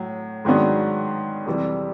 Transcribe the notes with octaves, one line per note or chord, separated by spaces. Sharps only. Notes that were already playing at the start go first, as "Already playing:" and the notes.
Already playing: A2 F#3
G#2 D#3 F#3 B3 D4
F2 C3 E3 G3